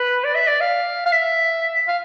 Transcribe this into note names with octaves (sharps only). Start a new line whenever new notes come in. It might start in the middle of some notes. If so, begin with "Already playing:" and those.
Already playing: B4
D5
E5
D5
F5
F5
E5
F5